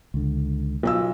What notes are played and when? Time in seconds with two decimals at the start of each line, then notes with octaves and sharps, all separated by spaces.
0.14 C#2 D3
0.83 B1 F4 E6